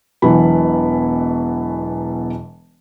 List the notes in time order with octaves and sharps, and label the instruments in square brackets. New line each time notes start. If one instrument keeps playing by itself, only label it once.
[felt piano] E1 B2 E3 F#3 B5